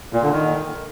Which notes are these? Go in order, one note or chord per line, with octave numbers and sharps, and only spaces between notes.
A#2
D3
D#3